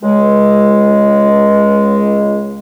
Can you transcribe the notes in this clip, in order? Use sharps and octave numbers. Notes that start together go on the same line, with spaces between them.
C#2 G#3